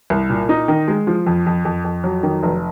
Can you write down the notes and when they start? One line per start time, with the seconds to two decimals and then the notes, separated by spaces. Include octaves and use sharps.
0.10 C2
0.30 A#2
0.49 D#4
0.68 D#3
0.88 G#3
1.07 F3
1.26 F2
1.46 F2
1.65 F2
1.84 F2
2.04 F#3
2.23 D#3
2.43 F1